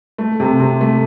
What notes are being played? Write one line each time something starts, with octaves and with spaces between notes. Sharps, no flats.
A3
C3
C3
A3